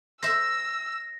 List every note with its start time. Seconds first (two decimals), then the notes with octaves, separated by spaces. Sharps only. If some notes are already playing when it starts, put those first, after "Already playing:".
0.23 C5 E5 E6 A#6